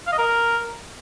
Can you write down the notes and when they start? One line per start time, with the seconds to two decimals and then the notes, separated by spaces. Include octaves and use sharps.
0.07 F5
0.12 D#5
0.18 A#4